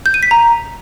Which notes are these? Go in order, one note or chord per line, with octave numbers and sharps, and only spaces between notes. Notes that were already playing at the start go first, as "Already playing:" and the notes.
G6
D#7
B6
A#5